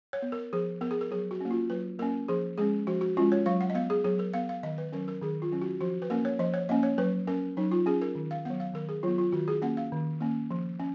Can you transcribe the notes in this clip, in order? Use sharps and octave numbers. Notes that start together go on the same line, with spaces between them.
C#5
B3
A#4
F3 G#4
B3 A#4
G#4
A#4
F#3 G#4
F#4
A#3 C#4
F4
F#3 B4
A#3 C#4 A#4
F3 G#4
G#3 C#4 G#4
F3 F#4
F#4
G#3 C#4 F4
C#5
F#3 F5
F#5
D#5
B3 F5
G#4
F#3 G#4
A#4
B3 F5
F5
D#3 D#5
B4
F#3 C#4 A#4
A#4
D#3 G#4
F4
F#3 C#4
F#4
F3 F#4
B4
A#3 C#4 A#4
C#5
F3 D#5
C#5
A#3 C#4 D#5
C#5
F#3 B4
C#4 A#4
F#3 D#4
F4
C#4 G#4
A#4
D#3
F5
F#3 B3 F#5
F5
D#3 A#4
G#4
F#3 B3 F4
F4
D#3 F#4
G#4
A#3 C#4 F#5
F5
D#3
A#3 C#4
F3
C#4